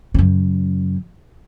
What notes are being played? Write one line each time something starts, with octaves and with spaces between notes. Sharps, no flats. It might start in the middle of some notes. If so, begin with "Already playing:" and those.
F#2 C#3